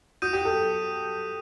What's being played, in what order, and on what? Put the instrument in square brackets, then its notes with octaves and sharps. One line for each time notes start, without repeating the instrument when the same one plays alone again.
[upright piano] F#4 [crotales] D#6 G6 D#7
[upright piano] G4
A4